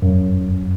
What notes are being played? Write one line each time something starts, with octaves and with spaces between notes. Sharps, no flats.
F#2